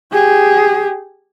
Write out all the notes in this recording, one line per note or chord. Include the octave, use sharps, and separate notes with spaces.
G4 G#4